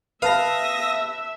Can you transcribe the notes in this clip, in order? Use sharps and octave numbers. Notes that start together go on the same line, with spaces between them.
B4 E5 F5 A5 D#6 A#6